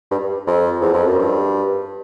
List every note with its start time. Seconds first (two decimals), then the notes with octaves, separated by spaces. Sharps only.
0.11 G2
0.47 F2
0.81 E2
0.94 F2
1.07 F#2
1.19 G2